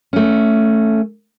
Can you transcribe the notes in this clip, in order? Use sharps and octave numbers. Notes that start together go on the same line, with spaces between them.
A3 C#4